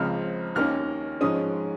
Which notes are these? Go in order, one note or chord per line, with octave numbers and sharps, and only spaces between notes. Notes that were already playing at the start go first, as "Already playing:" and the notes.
Already playing: C#2 C#3 F3 C4 F6
D#2 D#3 A#3 C#4 F6
G#2 F3 G#3 C#4 D#6